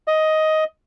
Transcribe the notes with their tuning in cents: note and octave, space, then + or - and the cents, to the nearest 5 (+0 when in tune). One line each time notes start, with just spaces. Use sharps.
D#5 +10